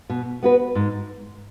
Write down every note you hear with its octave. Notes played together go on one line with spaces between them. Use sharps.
B2
B3 F#4 B4
G#2